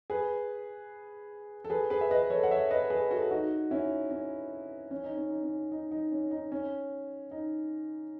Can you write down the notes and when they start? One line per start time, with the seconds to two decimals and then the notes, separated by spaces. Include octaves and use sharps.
0.10 G#4 B4
1.65 A4
1.70 G#4 B4
1.90 G#4 B4
2.01 E5
2.11 B4 D#5
2.23 B4
2.30 A4 C#5
2.43 F#5
2.51 C#5 E5
2.71 B4 D#5
2.90 G#4 B4
3.11 F#4 A4
3.31 D#4 F#4
3.71 C#4 E4
4.11 C#4
4.91 C#4
5.04 D#4
5.17 C#4
5.30 D#4
5.43 C#4
5.72 D#4
5.92 D#4
6.12 C#4
6.31 D#4
6.52 C#4
7.31 D#4